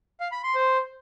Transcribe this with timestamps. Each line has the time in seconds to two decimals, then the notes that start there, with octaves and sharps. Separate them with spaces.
0.20 F5
0.32 B5
0.44 C6
0.55 C5